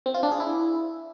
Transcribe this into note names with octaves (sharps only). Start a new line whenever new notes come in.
C4
F4
D4
G#4
E4